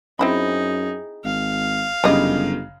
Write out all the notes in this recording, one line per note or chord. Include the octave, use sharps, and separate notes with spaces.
F#2 C4 D#4 E4 G#4 B5
G#1 F5
G1 F#2 C#3 G3 D#4 D#5